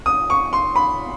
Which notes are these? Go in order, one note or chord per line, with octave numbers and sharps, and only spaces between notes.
D#6
C#6
C6
B5